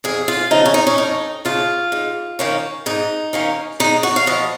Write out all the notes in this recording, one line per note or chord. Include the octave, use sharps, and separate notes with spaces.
F2 G#4
F4
C#3 F3 D#4
C#4
D#4
C#4
F2 D#4
C#3 F3 F4
G#2
D#3 A#3 C#4
G#2 D#4
D#3 A#3 C#4
G#2 D#4
F#4
F5
F3 B3 D#5